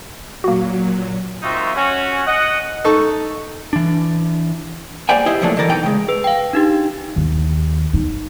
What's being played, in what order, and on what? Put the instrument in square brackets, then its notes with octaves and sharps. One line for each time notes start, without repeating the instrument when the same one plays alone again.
[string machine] A#2 F#3 [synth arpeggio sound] A#3 F#4
[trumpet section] A#3 C4 D#4 F4 F#4 E5
C#4 F#4
D#5 F#5
[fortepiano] D#4 A4 C#6
[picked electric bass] E3 D4
[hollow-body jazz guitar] A#3 G4 C5 D5 G5 G#5
E4 G4 C5 D#5
C3 F3 F#3 A3 A#3 D4
C2 D3 E3 A#4 D5
B2 E3 D#4 G5
C#3 G#3
[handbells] G#4 B4
F5 G5
D4 D#4 G4
[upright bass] D#2
D#4